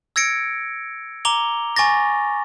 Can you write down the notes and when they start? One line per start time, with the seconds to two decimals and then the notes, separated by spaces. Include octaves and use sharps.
0.16 E6 G#6 A#6 C#7 D7
1.25 A#5 D6 F7 G7
1.76 G#5 C#6 D6 A6 A#6